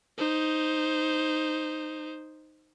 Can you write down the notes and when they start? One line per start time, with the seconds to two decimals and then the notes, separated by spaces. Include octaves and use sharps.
0.18 D#4 C5